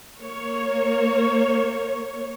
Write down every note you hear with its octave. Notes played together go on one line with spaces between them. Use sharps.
A#3 C#5